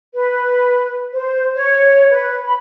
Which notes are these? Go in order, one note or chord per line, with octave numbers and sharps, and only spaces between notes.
B4
C5
C#5
B4
B5